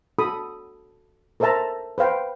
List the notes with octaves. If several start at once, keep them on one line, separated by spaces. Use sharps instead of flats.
F#4 A4 B5 D#6
A4 A#4 C5 E5 A5 A#5
B4 C5 F5 G5